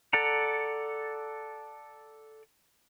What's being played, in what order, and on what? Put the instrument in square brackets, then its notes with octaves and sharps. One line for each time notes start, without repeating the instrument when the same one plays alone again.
[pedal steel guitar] A4 D5 F#5 A#5